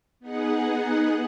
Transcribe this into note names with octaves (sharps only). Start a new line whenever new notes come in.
B3 D#4 G#4 F#5